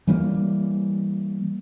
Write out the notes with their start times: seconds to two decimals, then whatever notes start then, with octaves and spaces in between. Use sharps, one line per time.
0.07 E3 G3 A3 A#3